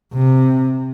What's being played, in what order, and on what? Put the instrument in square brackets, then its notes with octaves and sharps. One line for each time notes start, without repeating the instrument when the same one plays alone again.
[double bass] C3